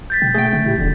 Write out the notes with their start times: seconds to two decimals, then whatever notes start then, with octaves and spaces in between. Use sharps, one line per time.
0.10 G6 A6 B6
0.22 B2 G5
0.34 A3 G#4 G5
0.53 C#3
0.65 A2 E4 G4
0.78 D#1 F2 A#2 D3